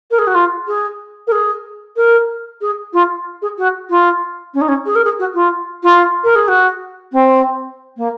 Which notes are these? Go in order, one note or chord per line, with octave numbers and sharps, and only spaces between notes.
A#4
G#4
F#4
F4
G#4
A#4
G#4
A#4
G#4
F4
G#4
F#4
F4
C#4
D#4
C#4
G#4
A#4
G#4
F#4
F4
F4
A#4
G#4
F#4
C4
A#3